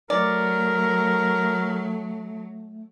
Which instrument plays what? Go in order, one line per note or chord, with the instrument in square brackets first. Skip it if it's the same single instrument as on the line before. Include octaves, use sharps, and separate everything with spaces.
[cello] F#3 [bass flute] A3 [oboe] A#4 [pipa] D5